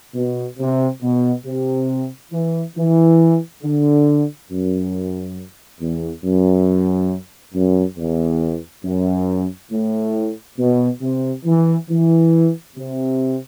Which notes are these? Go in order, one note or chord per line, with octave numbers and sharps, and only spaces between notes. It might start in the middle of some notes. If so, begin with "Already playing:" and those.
B2
C3
B2
C3
E3
E3
D3
F#2
E2
F#2
F#2
E2
F#2
A2
B2
C3
E3
E3
C3